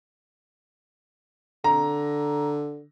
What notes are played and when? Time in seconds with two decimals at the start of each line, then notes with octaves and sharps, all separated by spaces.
1.64 D3 A#5